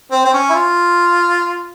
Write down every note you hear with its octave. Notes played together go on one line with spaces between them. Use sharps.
C4
C4
C#4
E4
F4